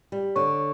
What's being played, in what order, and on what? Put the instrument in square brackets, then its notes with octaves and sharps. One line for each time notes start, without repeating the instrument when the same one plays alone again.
[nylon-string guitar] G3
[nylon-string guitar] D3 [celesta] C#5 C#6